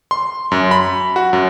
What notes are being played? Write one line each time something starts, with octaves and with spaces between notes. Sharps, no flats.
C6
F#2
B5
F#4
F#2